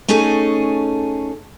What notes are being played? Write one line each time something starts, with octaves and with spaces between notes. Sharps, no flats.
A3 C#4 D#4 G#4 A4 G#5